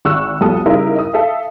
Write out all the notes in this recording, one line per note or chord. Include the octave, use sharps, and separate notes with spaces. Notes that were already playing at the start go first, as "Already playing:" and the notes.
G#1 C#6 E6 F#6
B1 F2 G3 A4 D#6
C#3 G3 D#4 E4 A#4
D#5 D#6
A4 E5 F5